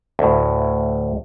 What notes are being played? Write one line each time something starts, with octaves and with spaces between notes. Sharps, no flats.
D2 A2